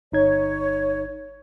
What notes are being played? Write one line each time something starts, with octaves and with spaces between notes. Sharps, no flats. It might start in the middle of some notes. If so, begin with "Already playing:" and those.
G1 D#4 C#5 G#6